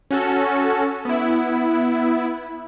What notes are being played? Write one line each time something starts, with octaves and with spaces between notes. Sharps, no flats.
C#4 F#4 A4
B3 E4